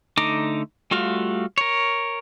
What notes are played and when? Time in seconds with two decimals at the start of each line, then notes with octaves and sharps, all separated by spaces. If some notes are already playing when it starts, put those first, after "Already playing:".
0.17 D3 A3 D#4 A#5 D6
0.91 G3 A3 F4 F#4 F5
1.58 A#4 C#5